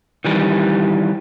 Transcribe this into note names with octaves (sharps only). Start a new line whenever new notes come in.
D#3 E3 G3